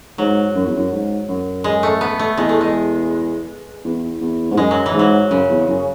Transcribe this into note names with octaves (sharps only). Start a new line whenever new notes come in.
G#2 F#3
F#2
E2
F#2
G#2
F#2
G#3
A3
B3
A3
E2 G#3
A3
G#3
E2
E2
G#2
F#2 G#3
F#3
E3
G#2
F#3
F#2 C#3
E2
F#2